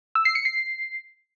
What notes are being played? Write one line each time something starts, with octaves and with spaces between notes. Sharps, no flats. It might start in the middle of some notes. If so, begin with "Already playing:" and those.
E6
C7
C#7
C7